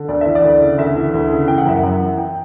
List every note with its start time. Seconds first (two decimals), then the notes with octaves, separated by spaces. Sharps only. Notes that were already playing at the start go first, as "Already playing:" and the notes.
Already playing: D3
0.08 D2 D5
0.21 E3 E5
0.35 D5
0.43 D2
0.61 C#3
0.78 D2 E5
0.96 E3
1.14 D2
1.31 C#3
1.48 E3 G5
1.58 F#5
1.66 F#2 E5
1.79 F#2 F#5
2.01 E3
2.18 E3 G5